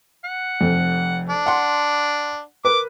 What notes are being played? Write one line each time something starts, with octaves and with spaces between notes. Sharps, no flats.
F#5
F1 F2
D4
F#5 C6
A#4 B4 D6